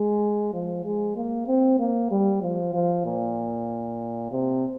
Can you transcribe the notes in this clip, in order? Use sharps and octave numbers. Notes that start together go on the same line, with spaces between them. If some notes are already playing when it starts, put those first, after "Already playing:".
Already playing: G#3
F3
G#3
A#3
C4
A#3
G3
F3
F3
A#2
C3